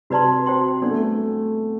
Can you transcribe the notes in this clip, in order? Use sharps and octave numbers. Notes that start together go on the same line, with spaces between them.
C3 F#4 B4 D5 A5 C6
F#4 C5 G5 C6
B3 D4 A4 D5
A3